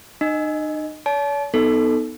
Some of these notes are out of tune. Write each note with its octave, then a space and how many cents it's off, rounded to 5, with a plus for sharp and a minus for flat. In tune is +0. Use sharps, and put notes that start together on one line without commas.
D#4 -40 D#5 +0
C#5 +45 A5 -35
B3 +0 D#4 +0 A4 +0